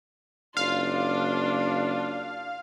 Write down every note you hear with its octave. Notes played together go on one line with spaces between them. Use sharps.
F#1 D4 F4 F5